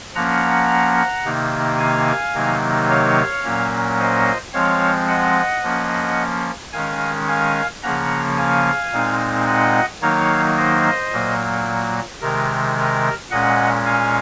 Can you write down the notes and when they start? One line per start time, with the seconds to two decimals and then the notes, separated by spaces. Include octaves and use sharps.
0.15 F3 A#3 C#4 F#5 A#5
1.25 C3 D#3 A#3 D#4
1.79 F5 G#5
2.35 C3 D#3 F#3 A#3 D#4
2.89 C#5 F5
3.44 A#2 F#3 A#3 C#4
3.99 C5 D#5
4.53 F3 G#3 C4 C#5 F5
5.08 D#5 F#5
5.63 F3 A#3 C#4
6.73 D#3 G#3 C#4 F5 G#5
7.28 F5 G#5
7.83 C#3 F3 A#3 C#4 F#5 A#5
8.37 F5 G#5
8.92 A#2 G#3 C4 D#4
9.47 D#5 F#5
10.02 D#3 F#3 A#3 D#4 C#5 F5
10.57 C5 D#5
11.12 A#2 F#3 A#3
12.21 C3 D#3 G#3 A#4
12.76 A#4
13.31 A#2 G#3 C#4 D#5 F#5
13.85 F5 G#5